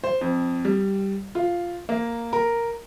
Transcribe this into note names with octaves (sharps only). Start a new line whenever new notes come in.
C5
F2
G3
F4
A#3
A#4